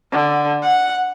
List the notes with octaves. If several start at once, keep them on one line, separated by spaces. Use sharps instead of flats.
D3
F#5